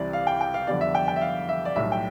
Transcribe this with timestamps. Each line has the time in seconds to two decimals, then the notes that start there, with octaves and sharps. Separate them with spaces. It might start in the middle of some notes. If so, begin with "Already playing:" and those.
Already playing: C2 C3 E3 D5
0.13 F5
0.27 G5
0.41 G5
0.54 F5
0.67 F2 D3 G3 B3 D5
0.81 E5
0.95 G5
1.08 G5
1.16 E5
1.21 F5
1.49 E5
1.65 D5
1.76 B1 A2 G3 E5
1.92 G5